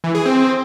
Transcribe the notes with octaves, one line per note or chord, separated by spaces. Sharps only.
E3
G#4
C4